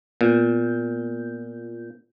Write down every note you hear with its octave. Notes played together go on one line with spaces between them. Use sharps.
A#2 B3 F4 G6